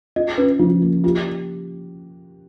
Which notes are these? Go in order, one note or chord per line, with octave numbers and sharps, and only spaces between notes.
F4 D#5
C#4 B4
F3 F4
A#3
F4 G4